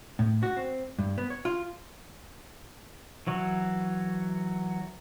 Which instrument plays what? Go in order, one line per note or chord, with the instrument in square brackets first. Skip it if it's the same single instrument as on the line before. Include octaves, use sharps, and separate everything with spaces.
[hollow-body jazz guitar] A2
F#4
C4
G2
B3
C#5
F4
[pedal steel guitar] E3 F#3 C#6